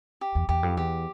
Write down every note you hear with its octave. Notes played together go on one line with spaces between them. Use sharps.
G4
E2
E2 G4
F2
E2 G4